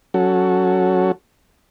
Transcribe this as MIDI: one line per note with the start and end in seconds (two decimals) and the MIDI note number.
0.14 1.12 54
0.14 1.12 61
0.14 1.12 66
0.14 1.12 69